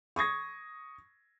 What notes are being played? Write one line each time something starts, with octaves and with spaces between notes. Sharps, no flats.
C#6 D#6 G#6 A#6